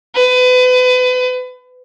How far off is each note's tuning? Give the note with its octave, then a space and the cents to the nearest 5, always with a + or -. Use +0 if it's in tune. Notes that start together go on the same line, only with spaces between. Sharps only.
B4 +30